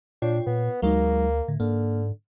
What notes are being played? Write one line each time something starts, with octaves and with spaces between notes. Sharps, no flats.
A#2 D4 F4 C#5 G5
A#2 B3
D2 F#3 G#3 A#3 D#4
A2 D3
G#2 D3 A#3